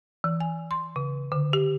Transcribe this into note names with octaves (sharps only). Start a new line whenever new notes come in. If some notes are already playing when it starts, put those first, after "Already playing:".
E3
G#5
C6
C#3
D3
G4